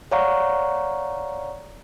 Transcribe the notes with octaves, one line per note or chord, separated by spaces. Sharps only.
C#5 D5 F5 F#5 A#5 C#6